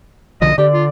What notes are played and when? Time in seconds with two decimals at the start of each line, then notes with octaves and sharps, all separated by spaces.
0.42 B1 D3 F3 D#5
0.58 D3 G4 D5
0.73 F4